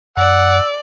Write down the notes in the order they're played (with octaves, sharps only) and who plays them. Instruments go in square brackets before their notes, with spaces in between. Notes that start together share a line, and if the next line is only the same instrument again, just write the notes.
[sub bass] F#2 [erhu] D5 [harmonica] F#5 [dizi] E6